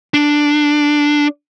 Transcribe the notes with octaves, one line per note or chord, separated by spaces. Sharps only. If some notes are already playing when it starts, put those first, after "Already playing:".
D4